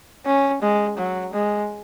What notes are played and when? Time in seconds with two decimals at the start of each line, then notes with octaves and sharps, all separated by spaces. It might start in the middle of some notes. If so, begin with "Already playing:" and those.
0.26 C#4
0.62 G#3
0.98 F#3
1.34 G#3